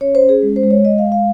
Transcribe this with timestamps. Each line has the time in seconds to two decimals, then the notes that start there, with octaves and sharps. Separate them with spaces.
0.01 C#4 C#5
0.15 C5
0.22 C#4
0.29 G#4
0.42 G#3
0.56 C5
0.63 G#3
0.70 C#5
0.84 G#3 D#5
0.98 F5
1.05 G#3
1.12 F5